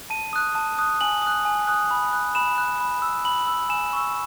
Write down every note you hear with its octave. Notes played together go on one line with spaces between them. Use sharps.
A5 D#7
D#6 F#6
A5
D#6 F#6
G#5 F#7
D#6 F#6
G#5
D#6 F#6
B5
F#6
B5 E7
F#6
B5
E6
B5 F#7
E6
G#5 E7
C#6 E6